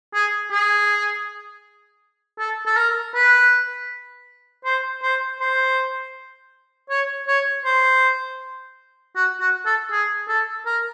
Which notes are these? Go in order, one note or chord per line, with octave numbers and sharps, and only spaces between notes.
G#4
G#4
A4
A4
A#4
B4
C5
C5
C5
C#5
C#5
C5
F#4
F#4
A4
G#4
A4
A#4